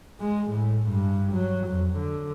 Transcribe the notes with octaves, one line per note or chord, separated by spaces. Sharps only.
G#3
A2
G2
F#3
F2
D3